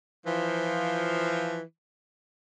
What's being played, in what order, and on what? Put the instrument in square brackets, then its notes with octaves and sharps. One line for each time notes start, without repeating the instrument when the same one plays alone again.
[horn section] E3 F3